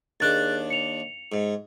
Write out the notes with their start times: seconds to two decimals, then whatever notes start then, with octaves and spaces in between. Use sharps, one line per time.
0.20 D#2 D4 G#4 F#6 A6
0.70 C#7 F7
1.32 G#2